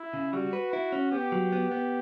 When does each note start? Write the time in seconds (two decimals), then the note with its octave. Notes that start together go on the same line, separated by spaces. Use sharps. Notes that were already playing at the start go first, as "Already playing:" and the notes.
Already playing: E4
0.14 C#3
0.33 G3 F#4
0.53 B4
0.73 E4
0.92 C#4
1.12 B3 G4
1.32 F#3
1.52 B3
1.72 B3